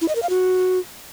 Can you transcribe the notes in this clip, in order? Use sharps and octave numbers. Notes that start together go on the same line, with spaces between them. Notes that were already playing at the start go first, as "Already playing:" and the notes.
E4
D#5
A#4
F5
F#4